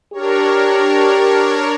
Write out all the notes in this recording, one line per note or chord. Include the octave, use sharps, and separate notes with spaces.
D4 G4 A#4 C#5